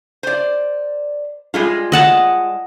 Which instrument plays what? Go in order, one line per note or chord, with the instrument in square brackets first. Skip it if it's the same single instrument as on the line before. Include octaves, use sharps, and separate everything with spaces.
[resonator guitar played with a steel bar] C5 D5
G3 G#3 F4
[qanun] D#5 F#5 A5